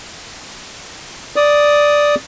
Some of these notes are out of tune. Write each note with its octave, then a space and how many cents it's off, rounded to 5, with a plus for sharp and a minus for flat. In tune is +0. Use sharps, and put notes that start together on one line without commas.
D5 +0 D#6 +0